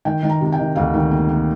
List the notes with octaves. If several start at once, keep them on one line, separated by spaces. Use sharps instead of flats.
D#3 G5
D#3
A#5
C3
G5
D#3
D2 F5
D#3
A#3
A#3